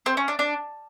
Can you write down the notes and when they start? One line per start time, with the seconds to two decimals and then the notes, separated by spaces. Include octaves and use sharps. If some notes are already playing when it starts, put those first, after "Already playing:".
0.06 C4
0.17 C#4
0.28 D4
0.39 D4